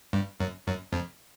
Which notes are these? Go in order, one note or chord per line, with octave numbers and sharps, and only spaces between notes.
G2
F#2
F#2
F2